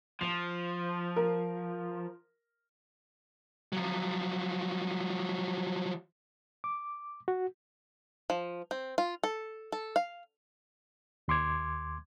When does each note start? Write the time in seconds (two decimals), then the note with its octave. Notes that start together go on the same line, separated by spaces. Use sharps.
0.21 F3 C7
1.16 A#4
3.73 F3 F#3
6.64 D6
7.28 F#4
8.30 F3
8.71 C4
8.98 F4
9.23 A4
9.72 A4
9.96 F5
11.28 D#2 C6 D6 G#6